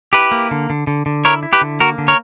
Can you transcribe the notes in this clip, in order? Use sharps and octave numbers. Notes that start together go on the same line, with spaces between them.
E4 G4 B4
A#3
D3
D3
D3
D3
E4 A#4 C#5
E4
G4 B4
D3
A#3 F#4 A#4
D3
A#4 C#5